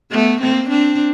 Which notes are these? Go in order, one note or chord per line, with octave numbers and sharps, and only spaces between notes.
A3 B3
A#3 C4
C4 D4